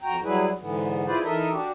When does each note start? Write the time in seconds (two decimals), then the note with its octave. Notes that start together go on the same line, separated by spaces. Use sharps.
0.02 F2 F#4 G5 A#5
0.23 F#3 G3 E4 G#4 B4
0.59 G#2 D3 E3 B3
1.06 E4 F4 G#4 B4 C5 D5
1.23 E3 D#4 A4 A#4 D#5 E5
1.51 D4 F#4 G4